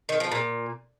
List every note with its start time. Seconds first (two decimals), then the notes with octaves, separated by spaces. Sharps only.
0.09 D#3
0.20 F3
0.32 A#2